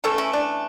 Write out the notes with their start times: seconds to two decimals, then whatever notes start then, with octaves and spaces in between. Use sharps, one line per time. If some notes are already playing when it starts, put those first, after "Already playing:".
0.04 C#3 E3 A3 A4 C#5
0.18 C#4 E4
0.33 D4